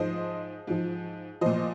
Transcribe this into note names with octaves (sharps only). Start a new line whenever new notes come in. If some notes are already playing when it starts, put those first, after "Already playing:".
Already playing: G#2 F3 C5 D#5
G#2 F3
A#2 F3 C5 D#5